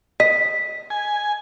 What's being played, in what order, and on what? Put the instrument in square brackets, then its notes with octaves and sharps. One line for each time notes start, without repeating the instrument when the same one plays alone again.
[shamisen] D#5 [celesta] B6
[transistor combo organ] G#5